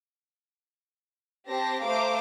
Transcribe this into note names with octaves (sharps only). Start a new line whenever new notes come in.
C4 G4 C5 A5 A#6
A3 C5 F5 A#5 D6